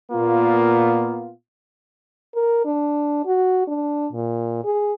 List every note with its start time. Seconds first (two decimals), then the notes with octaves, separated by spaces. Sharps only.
0.12 A#2 A#3 B3 F4
2.35 A#4
2.65 D4
3.26 F#4
3.67 D4
4.12 A#2
4.65 G#4